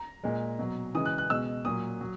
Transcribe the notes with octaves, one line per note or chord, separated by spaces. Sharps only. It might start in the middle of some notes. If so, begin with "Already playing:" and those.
Already playing: A#5
A#2 G#3
B2 F#3
C#3 E3 G#3 D#6
F#6
F#6
B2 G#3 E6
A#2 F#3 D#6
F#3